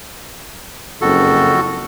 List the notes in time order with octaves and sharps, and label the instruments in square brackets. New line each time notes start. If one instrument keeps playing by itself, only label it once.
[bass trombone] F#1 [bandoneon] F2 F#4 A4